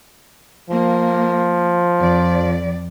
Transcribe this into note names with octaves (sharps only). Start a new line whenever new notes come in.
F3 A#3
F2 D5